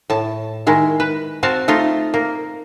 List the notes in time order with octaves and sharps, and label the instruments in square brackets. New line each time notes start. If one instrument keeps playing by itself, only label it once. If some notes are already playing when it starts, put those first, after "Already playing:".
[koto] A2 A5
D#3 G#3 E4
B4
C4 F#4 F5 A5
A3 D#4 F4
A#3